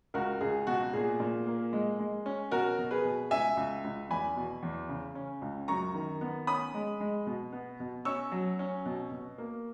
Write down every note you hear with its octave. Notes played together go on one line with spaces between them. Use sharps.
C#2 F#4 A#4
C#2 G#4
B2 F#4
A#2 G#4
A#2
A#3
G#3
G#3
C#4
B2 F#4 A#4
B2
G#4 B4
B2
C#2 E5 G#5
C#2
C#2
E2 G#5 B5
B2
E2
C#3
C#4
C#2
F#2 A#5 C#6
D#3
B3
C#4 B5 D#6
G#3
G#3
B2
B3
B2
C#4 C#6 E6
F#3
C#4
B2
B2
A#3